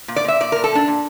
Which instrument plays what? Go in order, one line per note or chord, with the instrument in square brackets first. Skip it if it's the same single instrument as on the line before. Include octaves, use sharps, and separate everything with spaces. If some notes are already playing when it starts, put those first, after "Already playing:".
[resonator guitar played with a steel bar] A#2
D5
A#2 E5
A#2 D5
A#2 A#4
A4
A#2 D4
A#2